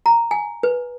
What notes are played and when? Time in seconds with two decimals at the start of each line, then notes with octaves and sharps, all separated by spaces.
0.06 A#5
0.31 G#5
0.63 B4